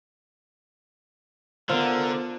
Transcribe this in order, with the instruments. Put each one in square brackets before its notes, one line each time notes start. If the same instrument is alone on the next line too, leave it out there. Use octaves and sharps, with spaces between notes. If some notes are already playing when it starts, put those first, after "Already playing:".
[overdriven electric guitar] D3 [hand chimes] B3 C5 [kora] F4 [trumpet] A#4